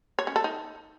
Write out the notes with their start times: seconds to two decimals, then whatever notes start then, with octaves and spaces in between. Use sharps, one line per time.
0.19 C#5
0.27 C#4
0.36 A4
0.44 D#4